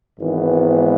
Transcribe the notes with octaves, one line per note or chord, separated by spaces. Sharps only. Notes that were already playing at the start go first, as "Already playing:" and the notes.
G#1 G#2 E3 B3